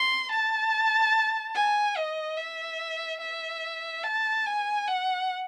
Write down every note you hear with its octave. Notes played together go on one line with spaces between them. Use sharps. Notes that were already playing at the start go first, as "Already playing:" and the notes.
Already playing: C6
A5
G#5
D#5
E5
E5
A5
G#5
F#5